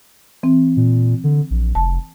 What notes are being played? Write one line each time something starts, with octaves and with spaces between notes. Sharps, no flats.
E3 C4
A#2
D3
A#1
F1 A5